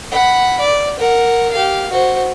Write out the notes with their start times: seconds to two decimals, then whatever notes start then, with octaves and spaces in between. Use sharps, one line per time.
0.11 F#5 B5
0.60 D5
0.99 A#4 F#5
1.52 G4 F5
1.91 F#4 C5